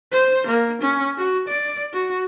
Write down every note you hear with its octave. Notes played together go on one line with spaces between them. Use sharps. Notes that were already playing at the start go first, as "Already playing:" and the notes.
C5
A#3
C#4
F#4
D5
F#4